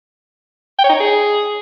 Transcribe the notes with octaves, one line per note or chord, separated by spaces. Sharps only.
G5
C#5
D#4
C#5
G#4